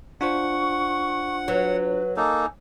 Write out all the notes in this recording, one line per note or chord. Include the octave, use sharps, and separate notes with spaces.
D4 F4 C5 F#5 C#6
F#3 B4
A#3 D#4 A4 G#5